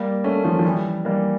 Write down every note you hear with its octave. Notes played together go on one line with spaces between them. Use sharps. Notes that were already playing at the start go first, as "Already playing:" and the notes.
Already playing: G3 A#3
A3 C#4
F3 A3
F3
E3 G3
G3 A#3